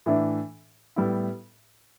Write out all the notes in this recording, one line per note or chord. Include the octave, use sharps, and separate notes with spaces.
A2 E3 A3 D4
A2 G3 B3 E4